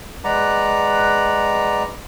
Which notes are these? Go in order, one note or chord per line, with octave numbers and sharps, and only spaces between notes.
G#3 B4 D5 F#5 A#5